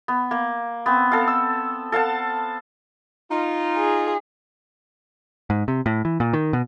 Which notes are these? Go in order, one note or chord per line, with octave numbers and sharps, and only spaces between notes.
B3
A#3
B3 C4
A4 F5
E6
A4 F5 F#5 A5
D#4 F4
G#4
G#2
C3
A2
E3
A#2
D#3
B2